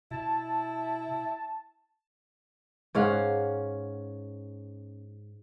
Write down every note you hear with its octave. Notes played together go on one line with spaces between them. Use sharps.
B2 E4 A5
G#2 C#4 F5 F#5